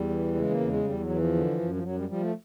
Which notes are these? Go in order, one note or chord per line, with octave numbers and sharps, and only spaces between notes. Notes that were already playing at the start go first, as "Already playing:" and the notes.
Already playing: E2 G3
E3
C#3 G#3
A#3
E2
G#3
E2 G3
F#3
E3
F3
D3
F#2
F3
F#2 F#3
G3
F3 G3
A3